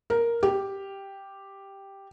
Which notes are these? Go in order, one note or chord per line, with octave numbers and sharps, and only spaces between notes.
A#4
G4